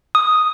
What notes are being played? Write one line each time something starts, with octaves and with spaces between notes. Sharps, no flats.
D#6